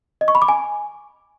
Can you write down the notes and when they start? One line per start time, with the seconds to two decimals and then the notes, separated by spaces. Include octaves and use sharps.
0.21 D#5
0.28 C#6
0.35 B5
0.42 D6
0.49 G#5